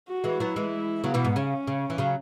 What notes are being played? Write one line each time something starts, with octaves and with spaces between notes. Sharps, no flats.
F#4
E3 G#3
F#3 B3 E4
E3 G#3
C#3 F#3 B3
B2 E3
G#2
C#3 C#4
C#3
E3
C#3 F#3